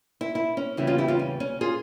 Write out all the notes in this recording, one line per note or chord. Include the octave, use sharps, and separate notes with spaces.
E4
E4
C#4
E2 C#3 G3 E4
C#4 F4
E4 G4
C#4 F4
C#4
C#4
F4 G#4